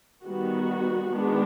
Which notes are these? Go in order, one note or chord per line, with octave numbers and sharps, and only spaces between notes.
D#3 G3 B3 F#4
D#3 G#3 B3 D4